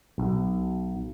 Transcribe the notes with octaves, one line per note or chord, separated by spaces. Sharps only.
B1